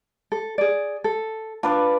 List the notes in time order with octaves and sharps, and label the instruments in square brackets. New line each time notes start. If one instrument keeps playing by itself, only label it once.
[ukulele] A4
G#4 D5
A4
[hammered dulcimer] D4 B4 D5 [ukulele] F4